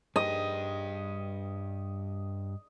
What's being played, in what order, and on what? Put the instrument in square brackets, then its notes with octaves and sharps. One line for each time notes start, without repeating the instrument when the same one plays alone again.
[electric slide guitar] G2 G4 [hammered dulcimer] D#5